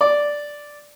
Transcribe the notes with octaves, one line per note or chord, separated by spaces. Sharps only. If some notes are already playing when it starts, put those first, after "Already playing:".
D5